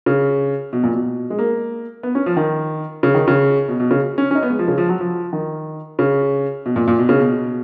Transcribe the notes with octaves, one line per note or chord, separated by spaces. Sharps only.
C#3
B2
A#2
B2
G#3
A#3
B3
C#4
F3
D#3
C#3
D#3
C#3
B2
B2
C#3
C#4
C#4
D#4
B3
G#3
F3
C#3
F3
F#3
F3
D#3
C#3
B2
A#2
A#2
B2
C#3
B2